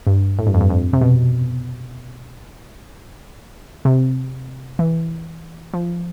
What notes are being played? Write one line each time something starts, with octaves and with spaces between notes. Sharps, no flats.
G2
A2
G2
F2
G2
F2
C3
B2
C3
E3
F3